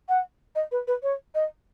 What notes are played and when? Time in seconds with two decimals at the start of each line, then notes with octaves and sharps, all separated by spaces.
0.09 F#5
0.55 D#5
0.72 B4
0.87 B4
1.03 C#5
1.35 D#5